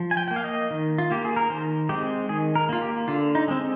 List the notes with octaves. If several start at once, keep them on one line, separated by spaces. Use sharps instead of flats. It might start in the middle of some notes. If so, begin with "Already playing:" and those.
Already playing: F3
G#5
G5
G5
A#3
F5
D#5
D#3
F4
A#3 G4
G#4
A#4
D#3 C5
G#3 C4 G4
D#3 G#4
A#4
A#3 F4
G4
D3 F4
D#4
G#3 C4